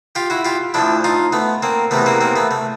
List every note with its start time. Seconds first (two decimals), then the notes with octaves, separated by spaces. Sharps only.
0.15 F4 G4
0.30 E4 F#4
0.45 F4 G4
0.74 D2 D3 F3 D4 E4
1.04 D#4 F4
1.32 A3 B3
1.62 A#3 C4
1.91 E2 C3 E3 A3 B3
2.06 A#3 C4
2.21 A#3 C4
2.36 A3 B3
2.51 A3